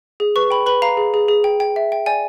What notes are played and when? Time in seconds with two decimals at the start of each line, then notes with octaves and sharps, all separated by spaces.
0.20 G#4
0.36 B4 C#6
0.50 G5 B5
0.66 B4 B5
0.82 F5 A#5
0.97 G#4
1.14 G#4
1.28 G#4
1.44 G5
1.60 G5
1.76 E5
1.92 G5
2.06 D5 G#5